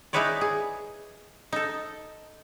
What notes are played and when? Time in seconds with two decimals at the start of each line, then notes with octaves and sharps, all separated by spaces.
0.13 D#4 E4 G#4 B4 C#5 D5
0.41 G#4
1.52 D#4 A4